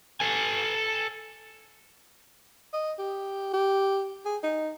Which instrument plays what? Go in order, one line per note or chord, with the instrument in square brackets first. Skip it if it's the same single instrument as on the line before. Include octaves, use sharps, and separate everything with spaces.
[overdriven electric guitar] A4 G#5
[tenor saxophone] D#5
G4
G4
G#4
D#4